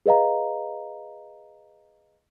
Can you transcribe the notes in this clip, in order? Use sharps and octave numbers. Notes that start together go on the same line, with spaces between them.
G#4 B4 D#5 F5 A#5